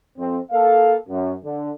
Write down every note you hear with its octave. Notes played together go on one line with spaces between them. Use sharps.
F2 C4
A#3 A4 F5
F#2
D3